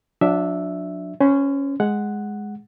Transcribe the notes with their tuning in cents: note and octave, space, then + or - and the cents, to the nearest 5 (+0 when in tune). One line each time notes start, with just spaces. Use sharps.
F#3 -45 D4 +0 E5 +0
C#4 +0 C5 -40
G#3 +0 F#5 +0